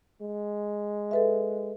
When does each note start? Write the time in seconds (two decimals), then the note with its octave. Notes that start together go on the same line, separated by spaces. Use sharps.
0.22 G#3
1.11 A4 B4 E5